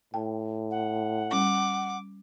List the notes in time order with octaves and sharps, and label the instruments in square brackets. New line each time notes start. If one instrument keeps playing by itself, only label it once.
[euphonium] A2 [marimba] G5 A5
[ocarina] F#5
[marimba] G3 C#4 [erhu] D6